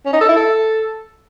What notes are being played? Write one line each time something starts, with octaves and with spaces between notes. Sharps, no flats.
C#4
D#4
A4
E4
A4